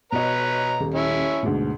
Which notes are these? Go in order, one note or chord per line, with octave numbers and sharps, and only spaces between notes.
B2 B4 C#5 D#5 A#5
D#1
C#4 E4
D2 G#2 B2